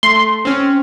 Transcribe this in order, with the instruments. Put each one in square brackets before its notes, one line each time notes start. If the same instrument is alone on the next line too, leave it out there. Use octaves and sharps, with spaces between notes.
[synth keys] A3 [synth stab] C6
[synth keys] C4 C#4